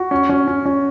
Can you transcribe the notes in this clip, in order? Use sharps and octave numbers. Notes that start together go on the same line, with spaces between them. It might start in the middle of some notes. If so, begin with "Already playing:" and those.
Already playing: F#4
C#4
C#4
C#4
C#4